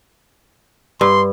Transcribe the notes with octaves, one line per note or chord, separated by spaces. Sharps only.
G2 C6